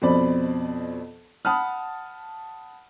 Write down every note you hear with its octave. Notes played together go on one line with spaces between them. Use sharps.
F2 B2 C4 D5 B5
F#5 A5 B5 D#6 F6